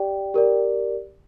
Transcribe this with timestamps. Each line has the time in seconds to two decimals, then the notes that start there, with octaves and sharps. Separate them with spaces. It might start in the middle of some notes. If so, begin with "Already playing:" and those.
Already playing: G4 D5 G5
0.34 G4 A#4 D5